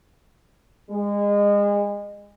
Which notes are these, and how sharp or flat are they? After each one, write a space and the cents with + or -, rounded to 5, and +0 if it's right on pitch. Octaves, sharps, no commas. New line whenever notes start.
G#3 -30